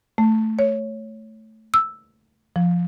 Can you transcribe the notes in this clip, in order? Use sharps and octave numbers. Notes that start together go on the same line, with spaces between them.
A3
C#5
E6
F3